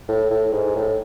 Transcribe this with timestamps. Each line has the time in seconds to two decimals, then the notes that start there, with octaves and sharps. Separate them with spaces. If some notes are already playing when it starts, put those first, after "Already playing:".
0.08 A2
0.31 A2
0.52 G#2
0.75 A2